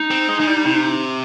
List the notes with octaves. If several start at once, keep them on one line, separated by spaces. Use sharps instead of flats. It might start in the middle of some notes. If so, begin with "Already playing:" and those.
Already playing: D#4
C4
G#3
G#3
G3
C3